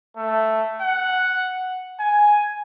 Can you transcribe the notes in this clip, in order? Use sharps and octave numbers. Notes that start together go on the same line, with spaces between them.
A3
F#5
G#5